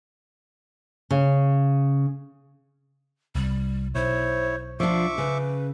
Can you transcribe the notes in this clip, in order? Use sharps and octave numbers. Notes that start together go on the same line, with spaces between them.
C#3
C2 G3
B1 E4 C5 C#5
F3 D4 F4 E5 C#6 D6
C#3 B4